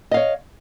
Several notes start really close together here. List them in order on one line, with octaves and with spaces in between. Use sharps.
D#5 F5 C#5